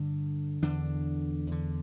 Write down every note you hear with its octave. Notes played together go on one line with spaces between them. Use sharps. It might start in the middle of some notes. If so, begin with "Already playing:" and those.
Already playing: G2 D3
E2 D3 D4
E2 D3